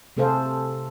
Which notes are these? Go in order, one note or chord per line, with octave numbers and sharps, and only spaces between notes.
C3 A3 G#4 A4 C5 F5